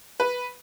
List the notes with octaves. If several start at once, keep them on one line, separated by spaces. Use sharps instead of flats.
B4